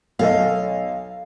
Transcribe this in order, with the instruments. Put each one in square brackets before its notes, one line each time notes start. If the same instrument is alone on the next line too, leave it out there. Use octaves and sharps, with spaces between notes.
[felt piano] B1 A4 D#5 [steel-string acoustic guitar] F5